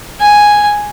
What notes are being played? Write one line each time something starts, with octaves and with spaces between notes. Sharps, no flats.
G#5